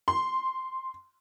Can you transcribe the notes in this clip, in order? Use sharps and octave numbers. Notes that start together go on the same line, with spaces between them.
C6